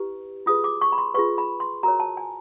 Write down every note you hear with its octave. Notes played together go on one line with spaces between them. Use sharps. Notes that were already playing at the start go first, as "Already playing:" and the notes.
Already playing: E4 G4 B4
F4 G#4 B4 D#6
D6
C#6
B5
C6
F4 G#4 B4 C#6
B5
C6
F#4 A#4 C#5 A#5
A5
G#5